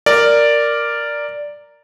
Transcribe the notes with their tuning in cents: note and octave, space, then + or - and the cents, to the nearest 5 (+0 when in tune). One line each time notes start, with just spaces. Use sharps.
A#4 -5 D5 +0